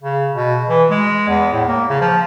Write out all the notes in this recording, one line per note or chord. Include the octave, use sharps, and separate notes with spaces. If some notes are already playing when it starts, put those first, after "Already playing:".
C#3
B2
E3
G#3
E2
A2
A#3
C#3
F3